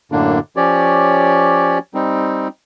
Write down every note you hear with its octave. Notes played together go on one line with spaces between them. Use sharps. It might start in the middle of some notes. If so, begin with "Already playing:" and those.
F#2 A2 D3 A#3 D4
F3 C#4 G4 C#5 D5
G3 C4 D#4